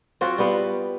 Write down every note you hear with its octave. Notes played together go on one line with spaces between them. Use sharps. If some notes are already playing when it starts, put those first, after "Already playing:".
F#3 C4 F4 F#4
G3 B3 F5